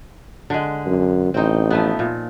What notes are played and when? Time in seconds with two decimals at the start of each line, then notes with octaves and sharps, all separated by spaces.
0.50 D3 G#3
0.86 F#2
1.34 A1 C4 D#4
1.70 F3 A3 B3
1.99 A#2